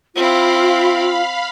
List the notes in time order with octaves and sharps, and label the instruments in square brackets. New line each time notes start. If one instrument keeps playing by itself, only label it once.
[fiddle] C4 E4 [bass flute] F4 [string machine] F5 B5